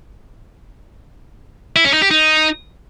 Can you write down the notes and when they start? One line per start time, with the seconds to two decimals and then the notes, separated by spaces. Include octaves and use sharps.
1.76 E4
1.85 C#4
1.93 D#4
2.02 G4
2.11 D#4